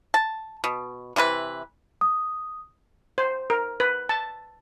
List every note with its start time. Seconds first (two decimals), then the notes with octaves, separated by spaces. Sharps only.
0.14 A5
0.64 B2
1.16 C3 E3 E4 B4
2.01 D#6
3.18 C5
3.50 A#4
3.80 B4
4.09 A5